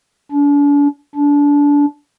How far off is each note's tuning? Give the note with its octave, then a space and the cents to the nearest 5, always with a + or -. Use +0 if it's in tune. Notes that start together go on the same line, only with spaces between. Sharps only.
D4 -40
D4 -25